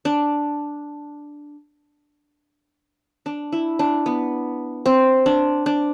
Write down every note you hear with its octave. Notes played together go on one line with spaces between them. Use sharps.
D4
D4
E4
D4
B3
C4
D4
D4